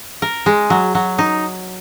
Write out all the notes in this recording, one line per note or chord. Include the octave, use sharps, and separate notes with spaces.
A#4
G#3
F#3
F#3
D#4